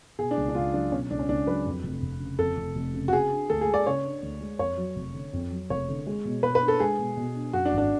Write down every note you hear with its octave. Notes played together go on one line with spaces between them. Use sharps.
B2 G#4
D4
C#2
D4
C#2 F4
F#3 D4
B2 C#4
C#2 D4
C#4
C#2 D4
F#3 B4
F2
F1
F1
C#3
F2 A4
F1
F1
C#3
F#4
C#3 G#4
D4
D2 A4
G#4
G#3
D5
C#3 C#5
D4
D2
G#3
F2 C#5
F#3
F1
D3
F2
F#3
F1 C#5
D3
G#3
B2
B2 B4
B4
D4
A4
G#3 G#4
B2
B2
D4
F#2 F#4
D4
G#1
D4